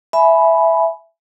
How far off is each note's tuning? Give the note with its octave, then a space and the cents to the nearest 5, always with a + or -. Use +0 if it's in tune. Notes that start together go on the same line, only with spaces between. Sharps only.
E5 +0 G#5 +25 B5 +0